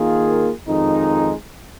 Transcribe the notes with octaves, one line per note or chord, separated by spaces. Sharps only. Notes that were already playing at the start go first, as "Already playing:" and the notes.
Already playing: D#3 A#3 F4 G#4
F2 D#3 G#3 D#4